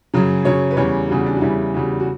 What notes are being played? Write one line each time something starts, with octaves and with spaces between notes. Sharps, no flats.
F#2 C#3 F#3
F#2 C#3 F#3 C#5
B4
E2 C#3 G3 C#5
E2 C#3 G3 F#4
D4
F#4
E2 C#3 G3 E4
E2 C#3 G3 F#4
F#4